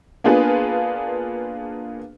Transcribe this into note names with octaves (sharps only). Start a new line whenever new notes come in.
A#3 B3 D4 F4 G#4 B4